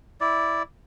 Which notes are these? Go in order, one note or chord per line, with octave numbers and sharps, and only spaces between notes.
E4 D5